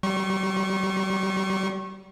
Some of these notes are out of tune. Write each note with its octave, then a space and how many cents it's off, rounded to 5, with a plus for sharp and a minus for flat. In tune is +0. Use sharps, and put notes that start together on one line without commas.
G3 -40 C#6 -30